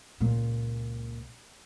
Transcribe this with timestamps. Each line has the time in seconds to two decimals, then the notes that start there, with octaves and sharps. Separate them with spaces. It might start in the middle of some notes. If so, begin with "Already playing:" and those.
0.21 C#2 A#2